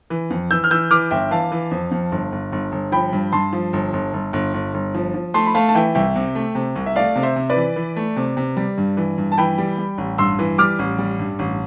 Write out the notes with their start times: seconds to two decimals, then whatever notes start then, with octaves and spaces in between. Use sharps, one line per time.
0.10 E3
0.30 F2
0.50 E3 E6 G6
0.64 F6
0.70 E3 E6 G6
0.91 E3 D6 F6
1.11 G1 E5 G5
1.31 E3 F5 A5
1.52 E3
1.71 F2
1.91 F2
2.12 G1
2.32 G1
2.52 G1
2.72 G1
2.92 F3 G5 B5
3.13 G2
3.32 G2 A5 C6
3.53 F3
3.73 G1
3.93 G1
4.13 G1
4.33 G1
4.54 G1
4.74 G1
4.95 F3
5.14 F3
5.34 A3 A5 C6
5.46 B5
5.55 A3 F5 A5
5.69 A5
5.74 E3 E5 G5
5.95 C2 E5 G5
6.16 C3
6.35 A3
6.55 C3
6.76 C2
6.86 E5
6.96 A3 D5 F5
7.16 C3
7.23 C5 E5
7.36 C3
7.50 B4 D5
7.56 E3
7.76 E3
7.96 A3
8.16 C3
8.37 C3
8.57 G3
8.78 G2
8.97 E3
9.18 G2
9.32 A5
9.38 E3 G5 B5
9.58 G3
9.78 G3
9.98 A1
10.18 G2 C6 E6
10.39 E3
10.58 G3 D6 F6
10.79 A1
10.98 G3
11.19 G2
11.39 A1